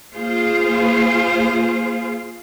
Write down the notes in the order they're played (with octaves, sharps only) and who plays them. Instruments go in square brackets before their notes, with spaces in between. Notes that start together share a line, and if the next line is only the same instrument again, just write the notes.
[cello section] A#3 F4 G#4 C5 F5